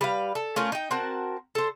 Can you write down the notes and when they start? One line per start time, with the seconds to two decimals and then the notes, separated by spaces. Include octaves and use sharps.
0.01 G3 B4 F5
0.35 A4
0.56 A3 C#4 F4 A#4
0.72 D#4 G5
0.91 C4 F#4 A#4 A5
1.55 A4 C5